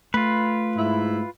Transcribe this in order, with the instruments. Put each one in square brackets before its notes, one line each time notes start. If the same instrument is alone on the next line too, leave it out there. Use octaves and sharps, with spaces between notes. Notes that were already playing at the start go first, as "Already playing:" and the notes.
[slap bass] A3 [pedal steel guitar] F4 B4
[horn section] G#2 E4